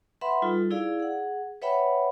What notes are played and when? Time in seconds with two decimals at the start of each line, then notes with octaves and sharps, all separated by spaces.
0.21 B4 E5 F#5 B5 C6
0.42 G3 D#4 F4 A4
0.71 E4 G#4 D5 F5
0.99 G#4 F#5
1.62 B4 C#5 E5 F#5 G5 B5